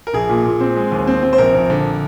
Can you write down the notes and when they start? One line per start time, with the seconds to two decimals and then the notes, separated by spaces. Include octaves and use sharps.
0.07 A#4
0.13 A#1 G#4
0.29 A#2
0.45 A#2
0.60 C4
0.76 G#3
0.92 D#2
1.07 C4
1.23 C4
1.33 C5
1.38 A#1 A#4
1.54 A#1
1.70 D3